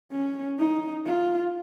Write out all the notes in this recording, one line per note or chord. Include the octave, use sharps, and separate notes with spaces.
C#4
D#4
F4